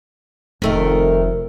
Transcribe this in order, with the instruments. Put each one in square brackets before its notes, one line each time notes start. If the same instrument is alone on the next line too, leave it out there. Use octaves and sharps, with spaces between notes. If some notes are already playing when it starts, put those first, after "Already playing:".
[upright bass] F1 [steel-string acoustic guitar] D#3 A3 A#4